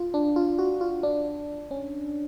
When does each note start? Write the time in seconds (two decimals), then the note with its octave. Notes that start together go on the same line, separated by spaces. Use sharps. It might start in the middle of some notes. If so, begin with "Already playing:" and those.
Already playing: F4
0.14 D4
0.36 F4
0.59 F#4
0.81 F4
1.03 D4
1.71 C#4